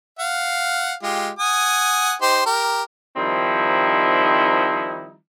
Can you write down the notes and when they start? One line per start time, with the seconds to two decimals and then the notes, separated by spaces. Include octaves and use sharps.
0.19 F5 F#5
1.03 G#3 F4 G4
1.39 F#5 G#5 D#6
2.21 D#4 G4 C5
2.46 G4 A#4
3.17 D#3 F3 G3 C4 D#4 E4